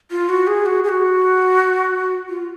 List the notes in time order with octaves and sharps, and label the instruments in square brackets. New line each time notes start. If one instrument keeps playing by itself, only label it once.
[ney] F4
F#4
G#4
F#4
G#4
F#4
F4